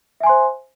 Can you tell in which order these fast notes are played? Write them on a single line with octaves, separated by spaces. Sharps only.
E5 G#5 C6 C5